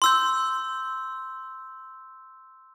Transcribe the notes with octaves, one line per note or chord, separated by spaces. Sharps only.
C6 E6 G6